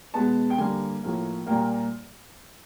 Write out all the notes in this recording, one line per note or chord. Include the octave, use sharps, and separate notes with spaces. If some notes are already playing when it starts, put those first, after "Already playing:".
B2 G#3 B3 A5
G5
D3 G3 A#3 G#5
A2 F3 A#3
A#2 G3 A#3 G5